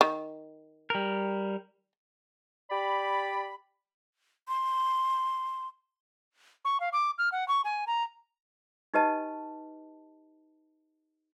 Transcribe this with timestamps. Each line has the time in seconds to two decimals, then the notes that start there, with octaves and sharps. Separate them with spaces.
0.01 D#3
0.90 G3 A#4
2.71 G4 D5 B5
4.48 C6
6.65 C#6
6.80 F5
6.93 D6
7.18 F6
7.32 F#5
7.48 C#6
7.65 G#5
7.87 A#5
8.94 D#4 G4 B4 D#5 A5